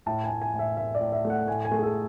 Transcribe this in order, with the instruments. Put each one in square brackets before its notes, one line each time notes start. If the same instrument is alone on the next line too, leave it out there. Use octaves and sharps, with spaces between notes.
[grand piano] A2 A5
G#5
A2
G#5
A2
E5
A2 E5
D5
A2
E5
A3
F#5
A2 G#5
G#5
A3
G#4
A4